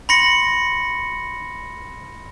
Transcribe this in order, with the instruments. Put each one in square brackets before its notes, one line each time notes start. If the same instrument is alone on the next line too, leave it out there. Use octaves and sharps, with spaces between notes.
[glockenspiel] B5 C6 A#6 C#7 F#7